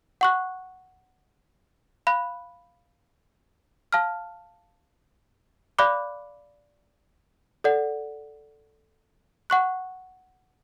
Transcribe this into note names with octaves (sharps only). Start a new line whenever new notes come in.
F#5 C#6 F#6
F5 B5 F#6
F5 A5 F6
D5 F5 B5 D6 F#6
A4 D5 F#5
F#5 C#6 F#6